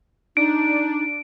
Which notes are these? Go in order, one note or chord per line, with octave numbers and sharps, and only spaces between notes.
D4 D#4 D7